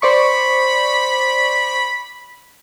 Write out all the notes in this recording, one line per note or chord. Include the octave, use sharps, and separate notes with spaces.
C5 D5 B5 C#6